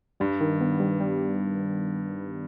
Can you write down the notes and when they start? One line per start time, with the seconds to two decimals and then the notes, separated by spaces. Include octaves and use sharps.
0.20 G2 G3
0.41 D#3
0.61 B3
0.80 G3
1.00 G3